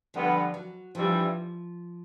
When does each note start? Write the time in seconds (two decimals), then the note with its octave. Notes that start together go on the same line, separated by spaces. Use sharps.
0.14 G2 D3 F3 G3 B3
0.54 F#3
0.95 G2 E3 F3 G3